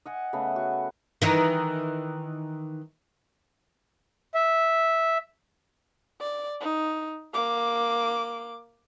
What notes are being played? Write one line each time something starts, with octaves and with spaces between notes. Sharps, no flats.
D#5 F#5 G#5
C#3 A3 B3
F#4
D#3 E3 D#4
E5
D5
D#4
A#3 D6